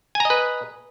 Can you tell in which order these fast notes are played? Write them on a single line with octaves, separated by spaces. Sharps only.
G#5 A#5 D#5 B4